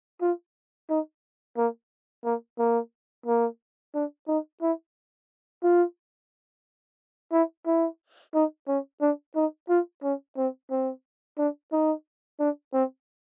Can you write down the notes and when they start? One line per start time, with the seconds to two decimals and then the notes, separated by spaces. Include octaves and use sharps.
0.22 F4
0.89 D#4
1.57 A#3
2.24 A#3
2.59 A#3
3.26 A#3
3.94 D4
4.28 D#4
4.62 E4
5.63 F4
7.32 E4
7.66 E4
8.34 D#4
8.68 C#4
9.01 D4
9.35 D#4
9.69 F4
10.03 C#4
10.37 C4
10.71 C4
11.38 D4
11.72 D#4
12.40 D4
12.73 C4